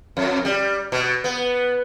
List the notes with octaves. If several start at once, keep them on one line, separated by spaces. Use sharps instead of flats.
F2
G3
B2
B3